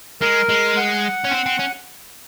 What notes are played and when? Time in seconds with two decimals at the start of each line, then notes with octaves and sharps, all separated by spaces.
0.21 G#3 A#4
0.49 G#3
0.77 F#5
1.24 C#4
1.31 C4
1.46 C4
1.60 C#4